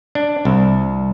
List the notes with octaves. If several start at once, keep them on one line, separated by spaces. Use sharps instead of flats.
D4
C2